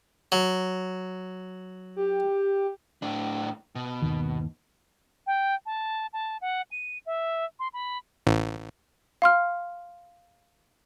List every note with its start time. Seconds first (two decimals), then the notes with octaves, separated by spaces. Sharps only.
0.32 F#3
1.96 G4
3.02 A2 D4
3.75 B2
4.02 G1 D#2 D#3
5.27 G5
5.66 A5
6.13 A5
6.41 F#5
6.71 D#7
7.06 E5
7.59 C6
7.74 B5
8.27 A1
9.22 F5 C6 F6